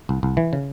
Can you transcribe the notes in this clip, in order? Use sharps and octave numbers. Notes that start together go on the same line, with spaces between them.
C2
C2
E3
C#3